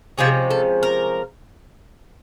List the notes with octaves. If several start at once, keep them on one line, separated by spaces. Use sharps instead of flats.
C3 F3 G#3 C#4 G#4
A4
A#4